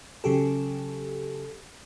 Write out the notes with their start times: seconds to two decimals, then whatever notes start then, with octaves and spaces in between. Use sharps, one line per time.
0.24 C#3 F#3 G4 A4